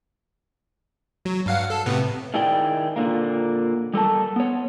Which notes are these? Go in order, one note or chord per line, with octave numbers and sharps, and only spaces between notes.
F#3
G2 F5 F#5
A4
A2 C3 B3
D#3 E4 G#4 D5 G5
A#2 D3 A#3
G3 A4 A#4 A5
B3 C#5